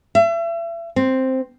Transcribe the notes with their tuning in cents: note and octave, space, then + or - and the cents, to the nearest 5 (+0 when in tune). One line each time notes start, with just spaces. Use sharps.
E5 +35
C4 +0